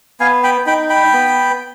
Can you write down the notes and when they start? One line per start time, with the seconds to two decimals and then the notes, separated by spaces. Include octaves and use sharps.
0.20 B3 F5 G#5
0.44 G5 B5
0.66 D#4 G5 B5
0.89 G5 B5
1.13 B3